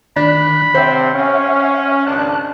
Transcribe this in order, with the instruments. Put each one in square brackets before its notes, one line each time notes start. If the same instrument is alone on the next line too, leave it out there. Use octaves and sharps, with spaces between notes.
[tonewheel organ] D#3 F#6 [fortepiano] D4 [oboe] B5
[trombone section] C3 C4 [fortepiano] C5 [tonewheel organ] C#5 E5 F#5
[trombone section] C#4 [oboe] F5
[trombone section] G#1 C#2 D4 [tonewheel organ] A5 F#6